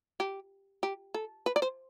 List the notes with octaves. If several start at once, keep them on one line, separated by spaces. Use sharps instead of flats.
G4
G4
A4
B4
D5
C5